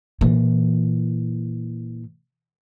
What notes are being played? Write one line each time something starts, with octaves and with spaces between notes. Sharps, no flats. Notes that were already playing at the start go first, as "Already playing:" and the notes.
A#2 E3